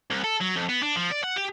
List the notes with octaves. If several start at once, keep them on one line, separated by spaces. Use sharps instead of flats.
C2
A4
F#3
F2
B3
D4
F3
D5
F#5
G4